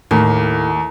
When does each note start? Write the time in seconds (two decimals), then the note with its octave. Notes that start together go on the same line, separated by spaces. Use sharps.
0.11 D#2 A2